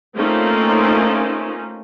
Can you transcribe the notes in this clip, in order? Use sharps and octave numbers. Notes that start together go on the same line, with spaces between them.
A3 A#3 C4 C#4 D#4 F4